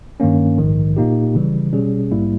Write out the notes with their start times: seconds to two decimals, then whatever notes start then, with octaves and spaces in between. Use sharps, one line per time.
0.20 G2 D#3 A#3 C#4
0.58 A#1 G#2 D#3
0.97 A#2 A#3 D#4 G4
1.35 C#3 E3 G3
1.73 B2 G3 C#4 G#4
2.11 A#1 G#2 G3 A#3 E4